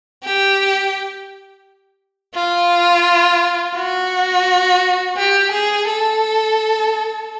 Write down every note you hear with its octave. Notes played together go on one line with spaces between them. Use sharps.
G4
F4
F#4
G4
G#4
A4